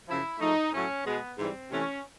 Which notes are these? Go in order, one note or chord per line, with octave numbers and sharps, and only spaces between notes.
F#2 C#3 F3 E4
G#2 F3 A3 D#4
A2 F#3 A3 C#4
B2 G#3 B3
G#2 E3 G3 C4
C3 E3 A3 C#4